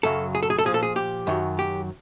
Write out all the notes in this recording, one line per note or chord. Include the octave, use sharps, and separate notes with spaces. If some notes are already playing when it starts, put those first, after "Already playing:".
F#2 C#3 F#3 A4
G#4
A4
G#4
A4
A#2 F3 G#4
A4
G#4
G4
F#2 D#3 F#3
G4